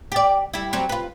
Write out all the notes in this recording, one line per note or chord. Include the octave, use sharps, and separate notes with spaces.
G4 D5
G3 E4
F#3 G3 C4
F4 B4